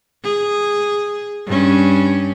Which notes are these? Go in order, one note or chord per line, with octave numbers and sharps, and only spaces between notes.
G#4
G2 C#4